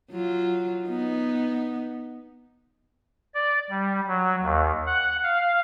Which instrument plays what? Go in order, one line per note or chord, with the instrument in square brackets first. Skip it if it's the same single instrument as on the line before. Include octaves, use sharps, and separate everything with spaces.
[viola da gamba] F#3 F4
B3 D#4
[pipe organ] D5
G3
F#3
D#2
F#5
F5